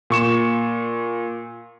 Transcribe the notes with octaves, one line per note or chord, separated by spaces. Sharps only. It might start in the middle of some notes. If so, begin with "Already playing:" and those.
A#2 C#6 E7